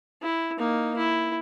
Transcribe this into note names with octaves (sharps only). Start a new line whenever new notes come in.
E4
A#3 D#4
E4